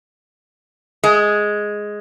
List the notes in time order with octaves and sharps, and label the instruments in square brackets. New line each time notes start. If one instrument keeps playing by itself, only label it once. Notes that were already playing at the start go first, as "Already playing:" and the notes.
[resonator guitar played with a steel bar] G#3